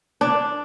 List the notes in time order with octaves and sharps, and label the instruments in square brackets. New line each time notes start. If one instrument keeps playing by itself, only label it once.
[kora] D4